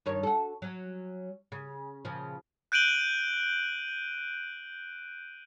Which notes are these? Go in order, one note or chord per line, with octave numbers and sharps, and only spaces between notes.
G2 D#3 C#5
F#4 A4
F#3 C#4
C#3
A#2 C#3 F3
F#6 G6 D7 D#7 F#7 G7